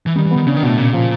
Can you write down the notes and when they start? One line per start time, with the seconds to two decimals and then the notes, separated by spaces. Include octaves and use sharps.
0.06 E3
0.16 D#3 G3
0.26 E3
0.31 B3
0.36 D#3
0.47 C#3 D4
0.57 D#3
0.62 B2
0.67 A2
0.77 A#2 C#3
0.93 F3